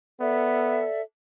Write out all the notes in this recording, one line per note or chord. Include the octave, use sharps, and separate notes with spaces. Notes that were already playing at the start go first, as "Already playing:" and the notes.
B3 A4 D5 E5